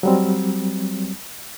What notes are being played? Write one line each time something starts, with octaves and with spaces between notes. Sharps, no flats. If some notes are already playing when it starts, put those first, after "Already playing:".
F#3 G3 C4